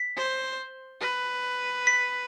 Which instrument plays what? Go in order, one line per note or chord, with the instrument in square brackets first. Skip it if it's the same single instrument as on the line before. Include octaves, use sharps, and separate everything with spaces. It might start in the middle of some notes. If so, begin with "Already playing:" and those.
Already playing: [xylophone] B6
[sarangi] C5
B4
[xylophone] B6